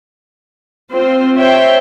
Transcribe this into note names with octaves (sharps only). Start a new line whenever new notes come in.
C4 F4 C5
C5 C#5 E5 G5